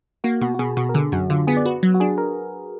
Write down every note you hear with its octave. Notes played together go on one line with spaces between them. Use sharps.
A#3 F#4
B2 F#4
F#4
B2 G#4
B2 F#4
A#4
D3 G#4
F#2 F#4
D3 F4
B3 G#4
D5
F#4 B4
F#3
F#4
D4 G#4
A#4